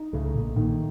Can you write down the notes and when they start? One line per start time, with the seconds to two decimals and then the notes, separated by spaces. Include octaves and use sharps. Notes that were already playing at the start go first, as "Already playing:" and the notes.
Already playing: D#4
0.13 C#2 C#3 A3
0.35 A#1 A#2
0.56 A#1 A#2 D#3